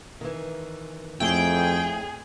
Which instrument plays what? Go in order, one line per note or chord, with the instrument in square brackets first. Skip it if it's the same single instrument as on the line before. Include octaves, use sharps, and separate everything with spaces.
[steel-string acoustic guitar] D#3 E3
[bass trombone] F2 [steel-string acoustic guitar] A3 E4 C#5 [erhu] G#4 [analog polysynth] G5